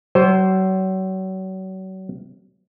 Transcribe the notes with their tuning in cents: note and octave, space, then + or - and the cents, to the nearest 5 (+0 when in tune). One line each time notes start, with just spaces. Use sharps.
F#3 +35 C5 +0